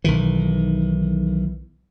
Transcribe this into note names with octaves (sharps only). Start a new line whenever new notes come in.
B1 D#3 E3